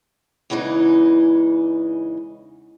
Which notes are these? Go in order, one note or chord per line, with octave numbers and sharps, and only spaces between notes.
E2 C#3 E3 G#3 D#4